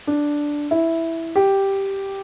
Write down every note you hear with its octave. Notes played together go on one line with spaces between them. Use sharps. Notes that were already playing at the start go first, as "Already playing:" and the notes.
D4
E4
G4